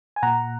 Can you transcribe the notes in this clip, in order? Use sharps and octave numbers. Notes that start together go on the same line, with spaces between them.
G#5
A#2 F#5 A#5